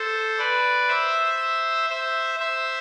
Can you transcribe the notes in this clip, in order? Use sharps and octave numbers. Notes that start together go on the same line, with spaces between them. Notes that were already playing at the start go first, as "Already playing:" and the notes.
Already playing: A4 C5
B4 D5
C5 E5
C5 E5
C5 E5